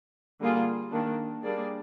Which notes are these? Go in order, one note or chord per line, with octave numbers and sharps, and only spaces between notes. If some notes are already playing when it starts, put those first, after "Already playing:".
D3 G3 A#3 F4 G#4
D#3 A#3 D4
G3 A#3 D4 G#4 D5